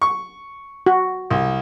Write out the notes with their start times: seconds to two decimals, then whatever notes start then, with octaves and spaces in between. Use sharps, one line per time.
0.02 C#6
0.86 F#4
1.31 C2